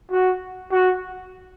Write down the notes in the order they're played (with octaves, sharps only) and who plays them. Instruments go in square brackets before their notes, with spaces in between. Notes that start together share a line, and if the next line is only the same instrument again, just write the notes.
[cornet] F#4
F#4